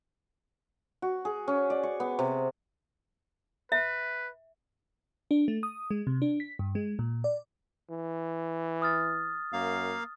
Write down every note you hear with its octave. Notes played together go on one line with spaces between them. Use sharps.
F#4
G#4
C#4
D5
C#6
B3
C3
B4 E5
D4
A3
D#6
G#3
C3
D4
B6
G2
G#3
A#2
D5
E3
D#6 F6 A6
F#2 A#3 F5